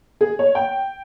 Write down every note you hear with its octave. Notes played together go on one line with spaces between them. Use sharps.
G#4
C#5
G5